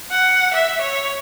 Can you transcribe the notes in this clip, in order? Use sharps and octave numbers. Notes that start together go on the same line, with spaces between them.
F#5
E5
C#5